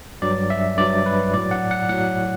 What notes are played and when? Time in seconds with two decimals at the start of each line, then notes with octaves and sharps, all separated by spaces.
0.22 G2 F#3 D5
0.50 E5
0.77 G2 F#3 D5
1.06 B4
1.33 A2 F#3 D5
1.51 F#5
1.71 F#5
1.89 A2 F#3 F#5